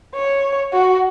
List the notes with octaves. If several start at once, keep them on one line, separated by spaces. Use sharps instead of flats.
C#5
F#4